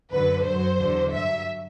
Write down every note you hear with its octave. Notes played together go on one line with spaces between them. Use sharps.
F#2 D3 F#3 B4
F#2 F#3 C5
E2 D3 F#3
G2 F#3 E5